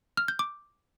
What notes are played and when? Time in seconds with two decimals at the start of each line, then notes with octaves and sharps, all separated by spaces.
0.17 F6
0.28 G6
0.39 D6